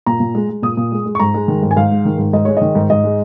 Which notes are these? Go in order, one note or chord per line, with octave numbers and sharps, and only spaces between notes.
A#2 A#5
A#2
G#3
G#3
A#2 D#6
A#2
G#3
G#3
C#6
G#2 A#5
G#3
D#3
G#2
G#5
G#2 F5
G#3
D#3
G#2
G#2 D#5
G#3 C#5
D#3 D#5
G#2
G#2 D#5
G#3